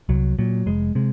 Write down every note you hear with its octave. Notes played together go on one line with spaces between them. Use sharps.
C2 F#3
A#2 F#3
F1 G#3
C3 G#3